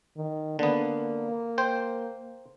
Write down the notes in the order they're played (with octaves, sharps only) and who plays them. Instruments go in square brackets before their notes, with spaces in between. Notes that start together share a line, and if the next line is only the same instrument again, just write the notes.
[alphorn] D#3
[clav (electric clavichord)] D3 B3 [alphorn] A#3
[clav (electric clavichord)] C5 G5